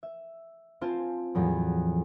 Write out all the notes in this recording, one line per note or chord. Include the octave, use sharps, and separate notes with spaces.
E5
C4 F4 C5 G#5 A5
E2 A2 F3 F#3